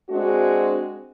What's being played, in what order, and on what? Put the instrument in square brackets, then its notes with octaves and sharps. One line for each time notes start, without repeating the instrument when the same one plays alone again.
[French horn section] G#3 C4 D4 F#4